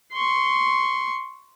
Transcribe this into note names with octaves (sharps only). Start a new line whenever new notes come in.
C6 C#6